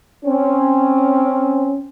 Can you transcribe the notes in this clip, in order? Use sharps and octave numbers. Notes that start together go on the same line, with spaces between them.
C4 C#4